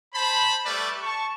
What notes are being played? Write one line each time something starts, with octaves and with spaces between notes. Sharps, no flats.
C5 A5 B5
G3 A3 B4 D5
A5 C#6